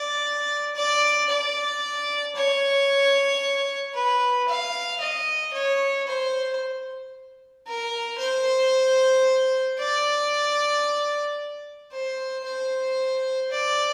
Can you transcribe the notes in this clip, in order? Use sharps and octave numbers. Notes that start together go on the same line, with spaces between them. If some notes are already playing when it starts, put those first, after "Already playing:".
Already playing: D5
D5
D5
C#5
B4
F5
D#5
C#5
C5
A#4
C5
D5
C5
C5
D5